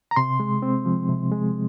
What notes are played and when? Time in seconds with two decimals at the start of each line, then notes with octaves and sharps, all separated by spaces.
0.11 A#5
0.16 C3 C6
0.40 G#3
0.62 C4
0.85 F3
1.08 C3
1.31 G#3